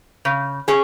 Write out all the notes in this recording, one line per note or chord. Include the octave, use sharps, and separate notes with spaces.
C#3
C#4 G#4